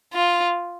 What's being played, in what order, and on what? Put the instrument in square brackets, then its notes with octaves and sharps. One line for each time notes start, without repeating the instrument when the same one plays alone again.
[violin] F4